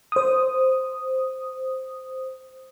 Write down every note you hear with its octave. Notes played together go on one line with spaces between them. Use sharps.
C5 D#6